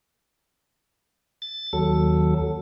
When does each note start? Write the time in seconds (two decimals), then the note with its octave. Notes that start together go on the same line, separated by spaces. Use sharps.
1.42 A6
1.73 D#2 F#3 A4